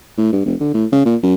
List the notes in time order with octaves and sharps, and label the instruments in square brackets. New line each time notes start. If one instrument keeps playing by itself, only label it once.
[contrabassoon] A2
G2
F1
D3
A2
C#3
A#2
F#2